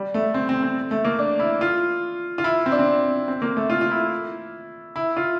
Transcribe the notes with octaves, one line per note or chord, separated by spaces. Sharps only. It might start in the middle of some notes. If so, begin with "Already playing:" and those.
Already playing: G3
A3
C4
C4
C4
A3
A#3
D4
E4
F4
F4
E4
C4
D4
C4
C4
A#3
A3
F4
F4
E4
E4
F4